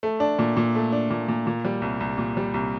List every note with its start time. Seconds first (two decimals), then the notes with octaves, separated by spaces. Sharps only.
0.03 A3
0.20 D4
0.39 A#2
0.57 A#2
0.75 A3
0.92 D4
1.11 A#2
1.28 A#2
1.47 A#2
1.65 G3
1.82 C2
2.00 C2
2.18 A#2
2.37 G3
2.54 C2